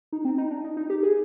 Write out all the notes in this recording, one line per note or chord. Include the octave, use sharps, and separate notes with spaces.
D#4
C4
D#4
D4
D#4
D#4
G4
G#4